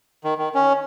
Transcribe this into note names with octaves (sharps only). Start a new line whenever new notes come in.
D#3
D#3
C#4